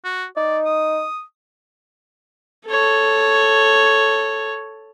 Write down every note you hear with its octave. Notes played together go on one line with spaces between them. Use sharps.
F#4
D#4 D5
D#6
A4 C#5